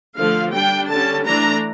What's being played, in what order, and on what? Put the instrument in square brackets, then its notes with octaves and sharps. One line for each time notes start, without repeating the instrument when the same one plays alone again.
[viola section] D3 F3 A3 F5
G3 D4 G5
D3 G3 C#4 A5
E3 A3 D4 A#5